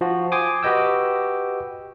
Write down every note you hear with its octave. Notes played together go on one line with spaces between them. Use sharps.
F3 F4 F#4
G5 G#5 C6 D6 D#6
F#4 G4 B4 D#5 G5 E6